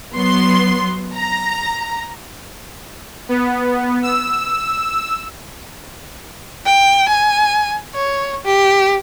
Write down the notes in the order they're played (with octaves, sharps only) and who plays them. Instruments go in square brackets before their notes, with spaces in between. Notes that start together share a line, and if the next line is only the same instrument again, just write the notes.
[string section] F#3 B3 C6
A#5
[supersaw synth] B3
E6
[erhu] G5
G#5
C#5
G4